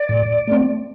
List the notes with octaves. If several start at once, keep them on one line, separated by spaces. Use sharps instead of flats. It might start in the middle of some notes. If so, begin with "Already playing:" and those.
Already playing: D5
A2
A3 C4